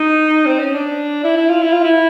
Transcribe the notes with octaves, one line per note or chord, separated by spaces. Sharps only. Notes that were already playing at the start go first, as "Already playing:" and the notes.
Already playing: D#4
C4
C#4
D4
E4
E4
F4
E4
F4
E4